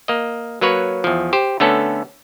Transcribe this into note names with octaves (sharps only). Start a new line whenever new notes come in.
A#3 D#5
F#3 A#3 B4 C#5
E2 F3
G4 C5
D3 A3 B3 C#4 A4